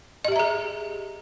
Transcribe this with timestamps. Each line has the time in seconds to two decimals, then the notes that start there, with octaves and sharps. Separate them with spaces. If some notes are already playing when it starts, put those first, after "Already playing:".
0.25 D#5
0.28 G4
0.32 E5
0.36 A#5
0.39 G#4